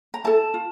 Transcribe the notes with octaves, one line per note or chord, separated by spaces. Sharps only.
A#5
E4 A4 A5
F4